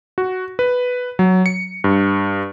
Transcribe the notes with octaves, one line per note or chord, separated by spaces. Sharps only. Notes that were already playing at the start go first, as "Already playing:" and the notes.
F#4
B4
F#3
C#7
G2